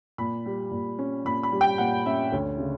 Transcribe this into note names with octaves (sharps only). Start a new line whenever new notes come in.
A#2 B5
G3
A#2
C#4
A#2 B5
B5
G3
G5
A#2 F#5
C#4 E5
D2 C#5
C#3